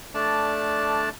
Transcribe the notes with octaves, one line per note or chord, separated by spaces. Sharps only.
A3 D4 D5 A5